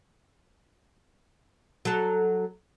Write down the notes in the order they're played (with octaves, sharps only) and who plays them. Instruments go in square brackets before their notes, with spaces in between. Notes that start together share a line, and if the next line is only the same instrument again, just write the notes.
[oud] F#3 A4